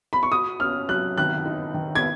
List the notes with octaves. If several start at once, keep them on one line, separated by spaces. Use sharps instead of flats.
B5
C#6
F#4 D#6
C#4 F6
F#3 F#6
D#3 F#6
D#4
D#3
G#6